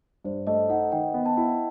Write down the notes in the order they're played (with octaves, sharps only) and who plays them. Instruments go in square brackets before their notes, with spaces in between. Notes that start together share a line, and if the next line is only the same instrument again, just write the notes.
[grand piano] G2 [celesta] C5
[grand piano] A3 [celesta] D#5
[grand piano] D#4 [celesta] F#5
[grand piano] D#3 [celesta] G5
[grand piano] B3
[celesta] A5
[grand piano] E4